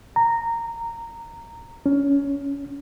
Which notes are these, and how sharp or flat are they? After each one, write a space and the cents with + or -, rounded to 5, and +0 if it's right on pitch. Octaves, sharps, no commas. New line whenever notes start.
A#5 -15
C#4 +20